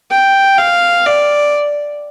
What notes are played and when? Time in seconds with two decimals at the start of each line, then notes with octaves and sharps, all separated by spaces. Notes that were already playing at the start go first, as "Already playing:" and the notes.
0.11 G5
0.58 F5
1.06 D5